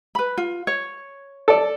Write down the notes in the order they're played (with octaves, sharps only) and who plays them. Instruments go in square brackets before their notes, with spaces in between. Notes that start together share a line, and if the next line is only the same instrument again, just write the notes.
[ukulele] B4 B5
F4
C#5
[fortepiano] A4 D5